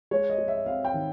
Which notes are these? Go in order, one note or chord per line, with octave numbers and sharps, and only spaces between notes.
G#3 C#5
D#5
G#3
E5
C4 F5
G5
D#3